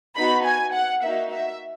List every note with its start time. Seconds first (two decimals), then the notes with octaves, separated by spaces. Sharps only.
0.16 B3 D#4 F#4 B5
0.45 G#5
0.74 F#5
1.03 A#3 D#4 F#4 E5
1.32 E5